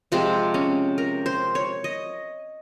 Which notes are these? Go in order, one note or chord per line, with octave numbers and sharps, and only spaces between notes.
C3 F3 G#3 C4
C#4
A#4
C5
C#5
D#5